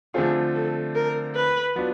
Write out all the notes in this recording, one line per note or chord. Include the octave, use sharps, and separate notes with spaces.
D3 F3 A3 C4 F4 G#4
A4
A#4
B4
F#3 B3 D4 F4